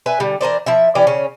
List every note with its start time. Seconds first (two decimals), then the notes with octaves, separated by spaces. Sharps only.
0.06 B4 E5 G#5
0.20 D3 G3
0.41 E3 A#4 C5 D5
0.66 F3 E4 E5
0.95 E3 C#4 G4 D5
1.07 C#3 C#4